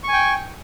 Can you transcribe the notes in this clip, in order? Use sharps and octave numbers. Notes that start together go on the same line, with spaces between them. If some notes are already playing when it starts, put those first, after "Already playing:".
G5 G#5 C#6